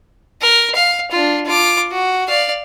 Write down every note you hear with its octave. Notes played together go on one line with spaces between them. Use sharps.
A#4
F5
D4 F4
F4 D6
F#4
D5 F5